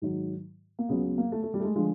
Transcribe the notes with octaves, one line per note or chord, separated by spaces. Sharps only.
G#2 D#3 F#3
A#3
C#2 C#3 F#3 B3
B3
A#3
A3
A3
G3
A3
G#3
D3 F3 G#3